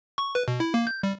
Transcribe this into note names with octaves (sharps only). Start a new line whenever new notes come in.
C#6
B4
B2
E4
A#3
G6
G3